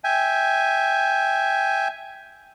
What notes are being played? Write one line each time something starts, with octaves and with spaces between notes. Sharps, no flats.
E5 G5 G#5